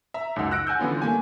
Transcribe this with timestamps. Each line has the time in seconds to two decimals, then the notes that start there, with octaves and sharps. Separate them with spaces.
0.14 E5 A#5
0.36 C#2 F#2 D#4 F#5 E6
0.51 E6 F#6 A#6 C#7 D7
0.67 F#5 G#5 E6 G6
0.79 D3 E3 G3 B3 C#4 F4
1.02 A3 A#3 G#5